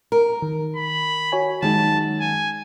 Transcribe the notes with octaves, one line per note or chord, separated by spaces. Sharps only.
A#4
D#3
B5
F#4 C#5 G#5
F#2 D#3 G#3 D#4 A5
G#5